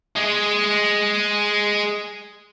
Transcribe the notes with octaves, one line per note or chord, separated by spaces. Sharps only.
G#3 G#4